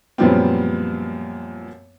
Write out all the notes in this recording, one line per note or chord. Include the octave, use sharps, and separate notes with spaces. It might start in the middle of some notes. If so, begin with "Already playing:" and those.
F#2 A#2 F3 G3 B3 C4